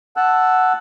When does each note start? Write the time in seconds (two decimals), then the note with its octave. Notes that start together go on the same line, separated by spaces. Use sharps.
0.17 F#5 A5 E6 F#6